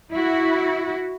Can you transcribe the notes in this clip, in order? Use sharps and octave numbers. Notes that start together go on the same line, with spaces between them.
E4 F#4